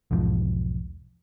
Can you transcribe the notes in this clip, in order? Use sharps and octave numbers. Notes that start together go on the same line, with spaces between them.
B1 E2 G#2 F3